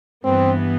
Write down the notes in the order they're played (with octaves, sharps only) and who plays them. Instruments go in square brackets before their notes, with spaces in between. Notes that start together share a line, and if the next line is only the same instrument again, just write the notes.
[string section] G2 E3 B3 [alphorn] C4